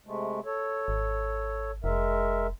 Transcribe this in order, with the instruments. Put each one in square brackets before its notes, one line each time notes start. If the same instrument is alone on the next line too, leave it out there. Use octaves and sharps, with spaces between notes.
[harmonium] C3 G#3 A3
A4 C#5
[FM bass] G#1
[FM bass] F1 [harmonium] G#3 A#4 E5